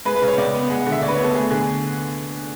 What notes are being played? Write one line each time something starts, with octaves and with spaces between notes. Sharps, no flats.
G#3 B4
B4
C#3
C#5
C#2 D5
B3
G#3 F#5
F#5
D3
E5
D2 D5
B4
C#5
B3
A4
A3 G#4
D3 G#4